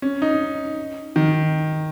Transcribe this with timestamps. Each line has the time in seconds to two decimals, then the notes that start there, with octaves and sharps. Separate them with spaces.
0.02 C#4
0.22 D#4
1.16 D#3